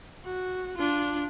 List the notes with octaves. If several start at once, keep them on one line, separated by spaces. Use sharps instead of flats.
F#4
D4 F4